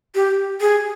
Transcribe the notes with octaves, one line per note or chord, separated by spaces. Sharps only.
G4
G#4